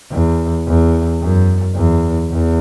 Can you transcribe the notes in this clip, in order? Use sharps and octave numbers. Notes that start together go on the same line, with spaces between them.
E2
E2
F#2
E2
E2